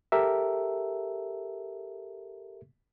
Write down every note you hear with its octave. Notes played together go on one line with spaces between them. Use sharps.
G4 A4 A#4 E5